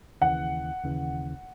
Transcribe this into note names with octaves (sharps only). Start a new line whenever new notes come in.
D#2 C#3 E3 F#5
D#2 C#3 E3